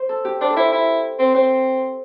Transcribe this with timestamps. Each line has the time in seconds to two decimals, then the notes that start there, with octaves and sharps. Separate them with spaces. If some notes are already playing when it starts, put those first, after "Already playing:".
Already playing: C5
0.09 A4
0.25 G4
0.41 D4 C5
0.50 A4
0.56 E4 C5
0.72 E4
1.19 C4
1.35 C4 C5